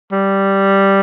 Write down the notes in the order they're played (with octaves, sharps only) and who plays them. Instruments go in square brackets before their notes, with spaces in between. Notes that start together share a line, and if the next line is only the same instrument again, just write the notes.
[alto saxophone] G3